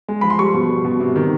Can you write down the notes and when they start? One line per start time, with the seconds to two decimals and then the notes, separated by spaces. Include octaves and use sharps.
0.08 G#3
0.21 F3 B5
0.30 C6
0.39 G3 C#6
0.54 B2
0.69 G3
0.84 B2
1.00 C3
1.16 D#3